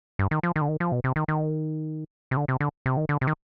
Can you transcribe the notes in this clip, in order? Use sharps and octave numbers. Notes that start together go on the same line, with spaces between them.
G2
D#3
F3
D#3
D3
D#3
F3
B2
C3
D#3
D#3
C3
D3
C3
D3
C3
D#3
D3
C3
D#3